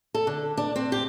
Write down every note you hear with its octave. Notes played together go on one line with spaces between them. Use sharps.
A4
D3
D4
C4
G4